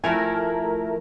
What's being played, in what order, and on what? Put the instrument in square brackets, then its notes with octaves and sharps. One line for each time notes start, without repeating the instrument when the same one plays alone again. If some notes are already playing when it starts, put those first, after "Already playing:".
[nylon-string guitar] F3 E4 G#5 [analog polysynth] A3 A#4